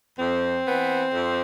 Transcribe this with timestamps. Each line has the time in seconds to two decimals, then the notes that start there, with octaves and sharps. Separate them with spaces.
0.19 F2 C4
0.66 E3 B3
1.13 F2